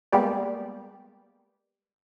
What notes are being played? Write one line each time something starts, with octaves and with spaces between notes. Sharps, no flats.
G3 G#3 A#3 B3 G4 D5